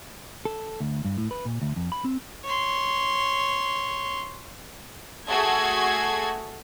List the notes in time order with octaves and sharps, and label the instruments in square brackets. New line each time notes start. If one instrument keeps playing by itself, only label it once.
[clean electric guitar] A4
D2
G2
A2
B4
A#2
D2
F2
B5
C4
[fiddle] C#5 C6
[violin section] A3 F#4 G#4 A4 G#6